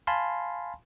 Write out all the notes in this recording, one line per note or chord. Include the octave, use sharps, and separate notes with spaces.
F5 G#5 A5 B5 C6